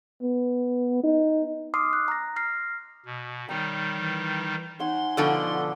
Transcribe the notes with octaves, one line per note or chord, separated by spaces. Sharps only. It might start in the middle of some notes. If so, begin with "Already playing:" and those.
B3
D#4
C6 D6 D#6 F6 C7
F#6
A#5 A#6
F6 A#6 C7
B2
D#3 G3 D#4 C#5 G5
E3
D#4 C#5 F#5 G#5 C6
B2 D3 F3 A4 D6